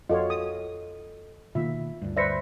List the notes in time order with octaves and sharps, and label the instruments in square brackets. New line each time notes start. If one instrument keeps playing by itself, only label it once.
[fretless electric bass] F2 [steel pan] F4 F#4 C#5 [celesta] A4 D#5
[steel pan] D#6
[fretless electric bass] B2 D#3 A#3 [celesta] F4 [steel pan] E5
[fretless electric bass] D2 G2
[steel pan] B4 C5 E5 [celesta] D5 A#6 C#7